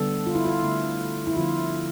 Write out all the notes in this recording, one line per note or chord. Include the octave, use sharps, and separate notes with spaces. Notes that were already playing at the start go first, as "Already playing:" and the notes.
Already playing: D3 G3 B3 A4
F4
E4
F4
D3 A3
E4
D3 F3 B3 F4